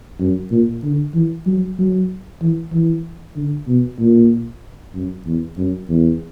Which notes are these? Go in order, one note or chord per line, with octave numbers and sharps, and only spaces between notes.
F#2
A#2
D3
E3
F#3
F#3
E3
E3
D3
B2
A#2
F#2
E2
F#2
E2